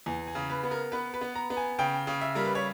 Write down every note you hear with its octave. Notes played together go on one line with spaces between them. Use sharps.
E2 G#5
G#5
C#3
B4
B3
A#4
B3 B4
B4
B3
A#5
B3
G#5
C#3 G5
C#3
E5
G3 A#4
B4
C#5